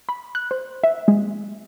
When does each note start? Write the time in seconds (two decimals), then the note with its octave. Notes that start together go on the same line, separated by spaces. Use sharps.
0.09 B5
0.35 F#6
0.51 C5
0.84 E5
1.08 G#3